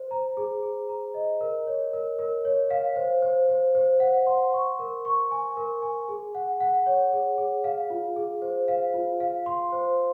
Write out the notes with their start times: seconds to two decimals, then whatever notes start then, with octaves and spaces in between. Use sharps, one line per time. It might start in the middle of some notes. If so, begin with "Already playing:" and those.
Already playing: C5
0.11 A#5
0.37 G#4
0.63 G#4
0.89 A#5
1.14 D#5
1.41 A#4
1.67 C#5
1.93 A#4
2.19 A#4
2.45 C#5
2.70 F5
2.96 C5
3.22 C5
3.49 C5
3.75 C5
4.00 F#5
4.27 C6
4.53 C#6
4.79 A#4
5.05 C#6
5.31 G#5
5.57 A#4
5.82 G#5
6.08 G#4
6.35 F#5
6.60 F#5
6.86 C#5
7.12 G#4
7.38 G#4
7.64 F5
7.90 F4
8.16 G#4
8.42 C5
8.68 F5
8.94 F4
9.20 F5
9.46 C6
9.72 C5